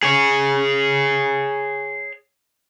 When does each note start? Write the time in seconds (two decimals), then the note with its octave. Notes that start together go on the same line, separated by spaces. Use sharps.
0.03 G#4 C#5